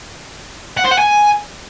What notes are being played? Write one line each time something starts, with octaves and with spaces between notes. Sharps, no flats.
F#5
C5
F#5
G#5